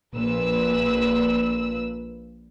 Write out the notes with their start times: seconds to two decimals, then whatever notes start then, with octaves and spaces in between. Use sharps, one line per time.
0.14 A#1 A#2 B4 E6